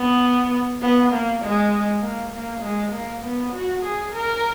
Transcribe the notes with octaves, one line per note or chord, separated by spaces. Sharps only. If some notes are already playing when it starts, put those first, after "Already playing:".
Already playing: B3
B3
A#3
G#3
A#3
A#3
G#3
A#3
B3
F#4
G#4
A#4